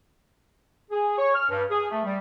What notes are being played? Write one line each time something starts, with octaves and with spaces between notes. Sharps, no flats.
G#4
C#5
F6
G2
G#4
A3
G3